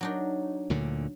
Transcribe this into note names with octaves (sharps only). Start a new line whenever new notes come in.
F#3 D4 D#4
D2 A#2 D3